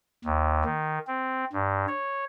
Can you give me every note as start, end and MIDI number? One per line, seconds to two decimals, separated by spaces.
0.25 0.64 39
0.64 0.99 51
1.07 1.45 60
1.53 1.86 43
1.88 2.25 73